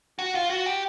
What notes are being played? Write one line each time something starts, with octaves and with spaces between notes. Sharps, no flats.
F#4
F4
F#4
G4